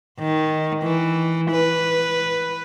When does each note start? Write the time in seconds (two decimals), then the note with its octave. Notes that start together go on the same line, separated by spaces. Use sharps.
0.19 D#3
0.83 E3
1.51 B4